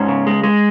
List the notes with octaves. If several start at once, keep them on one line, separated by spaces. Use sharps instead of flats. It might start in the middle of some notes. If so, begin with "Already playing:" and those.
Already playing: G#2 C#4
C#3
G#3
G#3